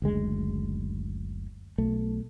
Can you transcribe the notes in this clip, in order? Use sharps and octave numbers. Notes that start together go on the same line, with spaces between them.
F#1 D2 G#3
B1 A3